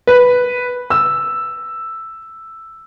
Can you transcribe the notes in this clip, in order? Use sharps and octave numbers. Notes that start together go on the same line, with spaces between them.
B4
E6